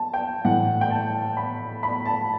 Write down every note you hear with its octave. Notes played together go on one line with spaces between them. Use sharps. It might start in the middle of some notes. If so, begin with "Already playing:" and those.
Already playing: A5
G5
A2 E3 F#5
G5
A5
B5
B5
A5